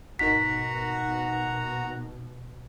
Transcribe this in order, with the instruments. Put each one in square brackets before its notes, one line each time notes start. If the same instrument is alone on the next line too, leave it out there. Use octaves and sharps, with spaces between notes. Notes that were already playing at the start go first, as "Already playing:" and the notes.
[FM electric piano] G#1 D#4 A#4 [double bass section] B2 [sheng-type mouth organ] F#4 F#5 A#5 [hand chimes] B6